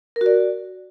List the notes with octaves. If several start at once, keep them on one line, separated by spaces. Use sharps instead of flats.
A#4
F#4
D5